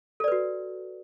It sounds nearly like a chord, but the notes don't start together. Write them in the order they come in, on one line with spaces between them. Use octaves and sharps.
A4 D5 B4 F#4